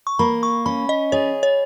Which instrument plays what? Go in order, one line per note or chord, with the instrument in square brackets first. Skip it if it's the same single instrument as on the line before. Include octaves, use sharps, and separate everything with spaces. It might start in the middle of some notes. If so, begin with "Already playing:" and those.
[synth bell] C#6
[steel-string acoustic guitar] A#3 [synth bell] B5
[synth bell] C#6
[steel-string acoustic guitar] C#4 [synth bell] B5
[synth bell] D#5
[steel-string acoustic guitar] G#4 [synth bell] C#5
[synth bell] C#5